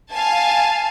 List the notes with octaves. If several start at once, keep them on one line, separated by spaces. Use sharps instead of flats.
F5 G#5 A5